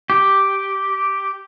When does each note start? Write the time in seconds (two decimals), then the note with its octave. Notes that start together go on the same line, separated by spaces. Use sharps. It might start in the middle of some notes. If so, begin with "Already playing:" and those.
0.10 G4